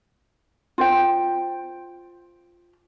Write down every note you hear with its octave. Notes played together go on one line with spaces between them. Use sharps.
F4 C5 G5